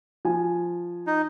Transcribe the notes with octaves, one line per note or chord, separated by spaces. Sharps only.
F3 G#5
D#4